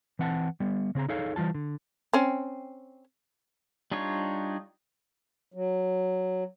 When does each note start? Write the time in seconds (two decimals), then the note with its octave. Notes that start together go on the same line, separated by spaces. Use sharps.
0.19 E3 C4 F#5 G5 A5
0.60 G3 B3
0.95 C#3 C4 G#4 A#5
1.09 D#4 G#4 A4 C#5 F5
1.36 E3 G3 F4 A5
1.54 D3
2.13 C4 C#4
3.92 G3 D4 D#4 F4 C#5
5.54 F#3